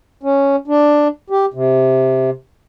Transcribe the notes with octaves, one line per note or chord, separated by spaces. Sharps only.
C#4
D4
G4
C3